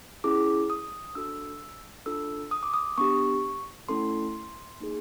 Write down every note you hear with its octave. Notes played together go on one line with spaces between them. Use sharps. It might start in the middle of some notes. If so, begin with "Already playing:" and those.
C#4 E4 G#4 D6
D#6
D4 F#4 A4 E6
D4 F4 A4 E6
D#6
D6
D#6
B3 D4 G4 C#6
A3 C#4 E4 A4 C6
A#3 D#4 G#4